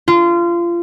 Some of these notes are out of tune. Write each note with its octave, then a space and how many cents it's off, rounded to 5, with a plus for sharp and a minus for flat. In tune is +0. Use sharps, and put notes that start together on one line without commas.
F4 -25